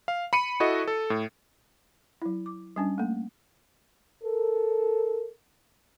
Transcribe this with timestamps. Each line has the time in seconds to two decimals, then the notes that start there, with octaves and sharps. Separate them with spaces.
0.08 F5
0.33 B5 C#7 D#7
0.60 E4 F#4 A4 D#5
0.88 A4
1.10 A2
2.22 F#3 E4
2.46 D6
2.76 G3 C#4 D4
2.98 A3 A#3
4.23 A4 A#4